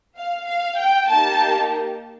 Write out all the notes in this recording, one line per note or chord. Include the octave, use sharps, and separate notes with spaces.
F5
F5
G5
A#3 D#4 G4 A5